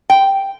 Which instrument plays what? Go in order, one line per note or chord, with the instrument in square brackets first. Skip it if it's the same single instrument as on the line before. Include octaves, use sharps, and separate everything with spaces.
[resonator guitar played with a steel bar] G5